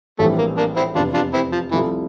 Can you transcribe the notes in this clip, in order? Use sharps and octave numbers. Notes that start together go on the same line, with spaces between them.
A#1 A2 E3 G3 A3 C4
A#3
A#3 D4
C4 E4
F1 E2 C3 D4 F4
D4 F4
C4 E4
F3
C2 C3 E3 F3 A3 E4